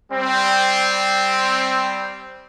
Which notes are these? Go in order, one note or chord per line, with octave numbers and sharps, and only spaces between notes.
G3 C4